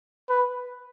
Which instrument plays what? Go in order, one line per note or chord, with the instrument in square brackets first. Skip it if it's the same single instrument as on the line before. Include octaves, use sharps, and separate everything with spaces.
[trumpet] B4